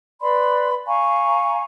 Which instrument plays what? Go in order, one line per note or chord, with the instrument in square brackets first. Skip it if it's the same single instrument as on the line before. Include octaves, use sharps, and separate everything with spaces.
[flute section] B4 D5 B5 C6
F5 G#5 A#5 C#6